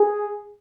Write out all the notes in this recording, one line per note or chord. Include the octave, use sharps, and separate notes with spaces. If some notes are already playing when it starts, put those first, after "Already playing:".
Already playing: G#4